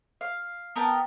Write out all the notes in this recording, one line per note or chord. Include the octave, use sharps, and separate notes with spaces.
F5
B3 A#4 G5 A5